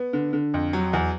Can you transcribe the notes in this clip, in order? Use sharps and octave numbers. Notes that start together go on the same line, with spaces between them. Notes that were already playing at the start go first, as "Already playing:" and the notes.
Already playing: B3
D3
D3
F2
F#3
E2